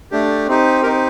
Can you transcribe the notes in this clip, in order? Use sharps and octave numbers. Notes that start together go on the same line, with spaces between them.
A3 D4 G4
C4 D#4 G4
C4 D#4 G4 A#4